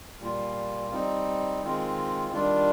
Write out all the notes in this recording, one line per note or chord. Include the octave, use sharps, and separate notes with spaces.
A#2 G3 A#3 F4
G3 C4 D#4
D#3 G#3 C4 F4
D#3 G3 D4 F4